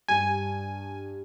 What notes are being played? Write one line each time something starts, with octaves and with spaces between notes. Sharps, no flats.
G2 G#5